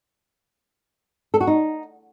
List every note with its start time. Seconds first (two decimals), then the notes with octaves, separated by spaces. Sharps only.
1.34 A4
1.41 F#4
1.47 D#4